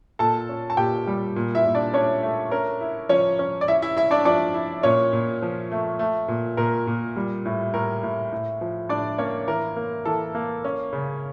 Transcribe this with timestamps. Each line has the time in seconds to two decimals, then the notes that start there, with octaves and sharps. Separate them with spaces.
0.19 A#2 A4 A5
0.49 C#4
0.70 A5
0.77 A#2 G4 G5
1.07 G3
1.36 A#2
1.55 E4 E5
1.65 A#2
1.75 D4 D5
1.94 C#4 D4 C#5
2.23 A3
2.51 C#4 A#4
2.81 E4
3.09 F3 C#4 C#5
3.39 C#4
3.61 D5
3.68 E4 E5
3.82 E4 E5
3.97 E4 E5
4.11 D4 D5
4.25 F3 D4 D5
4.54 E4
4.83 A#2 C#4 C#5
5.13 A#2
5.42 F3
5.71 A3
5.99 A3
6.28 A#2
6.57 A#2 A#4
6.87 A#2
7.16 G3
7.45 A2
7.74 A2 A#4
8.03 A2
8.33 A2
8.61 F3
8.89 A2 D4 D5
9.18 A#3 C#4 C#5
9.47 E3 A#4
9.76 A#3
10.05 E3 A4
10.35 A#3
10.65 C#4
10.93 C#3